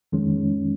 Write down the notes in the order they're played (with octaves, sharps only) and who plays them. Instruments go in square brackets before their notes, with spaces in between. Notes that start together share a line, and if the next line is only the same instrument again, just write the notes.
[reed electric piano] F2 D#3 G#3 C#4